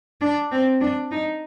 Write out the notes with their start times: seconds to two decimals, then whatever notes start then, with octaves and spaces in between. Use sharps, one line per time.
0.21 D4
0.51 C4
0.81 D4
1.11 D#4